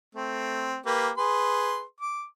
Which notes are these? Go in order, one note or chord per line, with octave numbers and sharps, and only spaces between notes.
A3 C4
A#3 G4 B4
G#4 B4 C6
D6